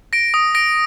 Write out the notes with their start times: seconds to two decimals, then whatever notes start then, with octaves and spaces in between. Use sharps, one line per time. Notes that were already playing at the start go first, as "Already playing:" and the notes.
0.13 A#6 D7
0.34 D#6
0.55 A#6 D7